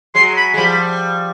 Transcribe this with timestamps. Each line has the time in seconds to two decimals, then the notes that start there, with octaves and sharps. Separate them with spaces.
0.15 F#3 G#3 C6
0.37 B5
0.54 G#3
0.57 F3 G3 B5